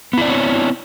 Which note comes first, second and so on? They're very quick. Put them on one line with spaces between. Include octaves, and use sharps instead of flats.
B3 E4 D5 C4 C#5